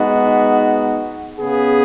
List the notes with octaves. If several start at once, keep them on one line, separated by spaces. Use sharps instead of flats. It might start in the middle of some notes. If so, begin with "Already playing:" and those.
Already playing: G#3 B3 D#4 F#4
C#3 B3 G#4